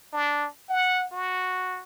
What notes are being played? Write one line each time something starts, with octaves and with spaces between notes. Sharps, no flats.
D4
F#5
F#4